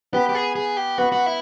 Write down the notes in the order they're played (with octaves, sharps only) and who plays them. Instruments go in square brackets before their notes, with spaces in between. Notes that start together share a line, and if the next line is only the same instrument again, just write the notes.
[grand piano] B3 [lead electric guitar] G4
[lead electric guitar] G4
G#4
G#4
G4
[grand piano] B3 [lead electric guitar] F#4
[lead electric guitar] F#4
E4